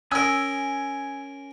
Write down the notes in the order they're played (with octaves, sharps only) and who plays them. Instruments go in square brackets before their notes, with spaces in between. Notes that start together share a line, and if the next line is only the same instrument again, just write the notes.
[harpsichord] C#4 A#4 [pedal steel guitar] G#5 D#6 E6